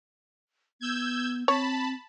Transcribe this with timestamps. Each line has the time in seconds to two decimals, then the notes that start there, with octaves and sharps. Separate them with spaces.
0.81 B3 E6 G6 G#6
1.48 C4 C#5 A5 B5